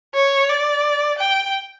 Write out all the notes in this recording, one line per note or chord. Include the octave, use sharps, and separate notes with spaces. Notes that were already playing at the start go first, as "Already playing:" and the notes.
C#5
D5
G5